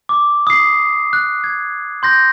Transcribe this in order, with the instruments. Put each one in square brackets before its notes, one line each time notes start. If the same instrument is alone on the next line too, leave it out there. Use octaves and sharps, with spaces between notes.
[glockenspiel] D6
D#6 C7
F#6
G#6
C6 G6 A#6